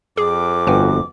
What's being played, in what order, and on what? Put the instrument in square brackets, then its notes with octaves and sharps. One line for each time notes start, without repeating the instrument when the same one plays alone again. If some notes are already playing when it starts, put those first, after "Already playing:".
[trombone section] F2 [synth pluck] G#4 [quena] D6
[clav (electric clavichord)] G1 F#4 [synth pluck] B4 G5 G#5